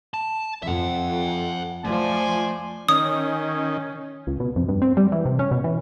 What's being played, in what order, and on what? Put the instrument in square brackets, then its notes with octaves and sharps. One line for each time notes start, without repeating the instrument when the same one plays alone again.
[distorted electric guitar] A5
[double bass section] F2 [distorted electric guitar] E5 F#5
[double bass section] F3 [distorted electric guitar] A3 [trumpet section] C5 D5 G#5
[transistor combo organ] D#3 [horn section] C#4 [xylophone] D#6
[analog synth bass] C#2
B2
F2
G2
C4
G3
E3
C3
C#4
B2
E3